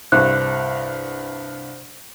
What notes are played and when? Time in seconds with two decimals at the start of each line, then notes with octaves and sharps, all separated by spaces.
0.12 C2 G2 C5 F#6